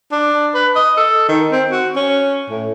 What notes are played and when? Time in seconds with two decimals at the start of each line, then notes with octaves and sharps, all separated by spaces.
0.12 D4
0.55 B4
0.76 D#5
0.97 A4
1.29 D#3
1.52 C4
1.71 F#4
1.96 C#4
2.50 A2